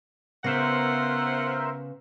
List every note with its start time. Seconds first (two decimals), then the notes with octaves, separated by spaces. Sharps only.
0.44 C#3 B3 F4 A#4 C5 E5 F#5